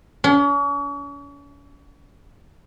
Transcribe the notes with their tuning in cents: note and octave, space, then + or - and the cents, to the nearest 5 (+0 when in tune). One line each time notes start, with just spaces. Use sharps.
C#4 +40